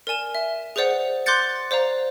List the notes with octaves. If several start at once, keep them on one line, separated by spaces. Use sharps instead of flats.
A#4 D5 G#5 E7
E5
G#4 B4 C5 D5 F#5
C6 D6 F#6 G6 A6 C#7
C5 D5 F5 A#5